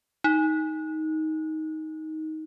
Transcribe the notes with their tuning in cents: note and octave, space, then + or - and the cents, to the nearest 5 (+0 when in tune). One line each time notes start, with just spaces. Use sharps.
D#4 +15